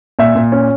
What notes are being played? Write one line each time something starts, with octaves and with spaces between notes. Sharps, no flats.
A#2 E5
A#2
C#4